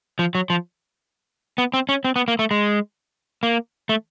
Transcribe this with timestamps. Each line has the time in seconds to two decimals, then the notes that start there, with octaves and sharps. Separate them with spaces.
0.19 F3
0.35 F#3
0.50 F3
1.58 B3
1.74 C4
1.89 C#4
2.04 C4
2.16 B3
2.28 A#3
2.39 A3
2.51 G#3
3.43 A#3
3.89 A3